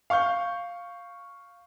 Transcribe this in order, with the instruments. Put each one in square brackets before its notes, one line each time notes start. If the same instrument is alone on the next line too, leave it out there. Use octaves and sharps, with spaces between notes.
[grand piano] F5 C#6 F6 G6